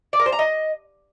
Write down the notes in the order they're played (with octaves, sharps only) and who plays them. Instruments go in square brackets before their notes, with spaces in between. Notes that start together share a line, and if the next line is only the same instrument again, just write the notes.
[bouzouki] D5
A#4
C5
A#5
D#5